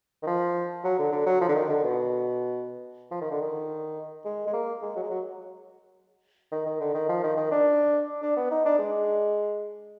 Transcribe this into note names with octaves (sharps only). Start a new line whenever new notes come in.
D#3
F3
F#3
D3
D3
F#3
F3
D3
D#3
D3
B2
F3
D#3
D3
D#3
G#3
G#3
A#3
G#3
F#3
G#3
F#3
D#3
D#3
D3
D#3
F3
D#3
D#3
D4
D4
B3
D#4
D4
G#3